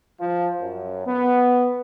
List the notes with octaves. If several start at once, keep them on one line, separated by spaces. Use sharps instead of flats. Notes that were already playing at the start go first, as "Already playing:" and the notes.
F3
F#2
B3